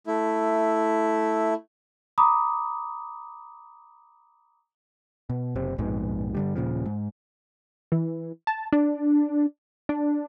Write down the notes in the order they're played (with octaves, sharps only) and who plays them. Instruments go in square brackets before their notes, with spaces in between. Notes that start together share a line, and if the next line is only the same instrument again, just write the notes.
[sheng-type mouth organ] A3 E4
[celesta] A#5 B5 D6 D#6
[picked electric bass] B2
F#1 C3 C4
A#1 F2 G#2 B2
G2 D3 G3
D#1 A#2 C#3 F3
G#2
[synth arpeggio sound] E3
A5
D4
D4